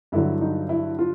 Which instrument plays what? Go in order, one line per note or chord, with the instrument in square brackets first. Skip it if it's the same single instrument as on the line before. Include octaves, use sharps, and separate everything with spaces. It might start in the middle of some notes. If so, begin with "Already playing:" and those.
[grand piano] G2 D3 F#3 E4
D#4
E4
F4